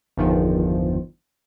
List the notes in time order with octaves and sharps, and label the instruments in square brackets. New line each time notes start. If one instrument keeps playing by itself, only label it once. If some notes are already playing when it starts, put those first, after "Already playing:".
[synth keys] G1 E2 D#3 F3